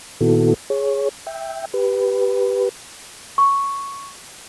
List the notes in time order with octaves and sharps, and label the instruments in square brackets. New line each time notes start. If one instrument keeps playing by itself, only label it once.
[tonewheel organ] A#2 D#3 B3 E4 F#4 A4
G#4 C#5
E5 G5
G4 B4
[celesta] C#6